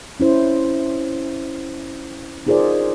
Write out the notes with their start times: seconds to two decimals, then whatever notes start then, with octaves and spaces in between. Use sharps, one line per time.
0.20 C#4 E4 C5
2.47 D#4 F4 G#4 A#4 C5 D5